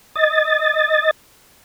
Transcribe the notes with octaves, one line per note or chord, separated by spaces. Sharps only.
D#5 A6